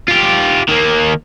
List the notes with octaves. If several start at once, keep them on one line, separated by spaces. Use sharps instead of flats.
F4 G4
D#3 A#3